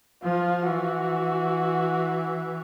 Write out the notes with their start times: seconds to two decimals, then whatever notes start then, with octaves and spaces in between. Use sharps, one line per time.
0.23 F3 F4
0.65 E3 F#4